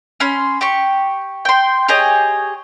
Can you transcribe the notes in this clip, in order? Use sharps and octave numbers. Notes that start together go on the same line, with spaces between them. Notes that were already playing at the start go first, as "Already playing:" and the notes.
C#4 B5 C6
G4 C#6
G5 C6
G4 G#4 C#5 D#5